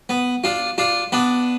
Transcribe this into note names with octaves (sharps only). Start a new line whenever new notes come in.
B3
D4 F4
D4 F4
B3 D4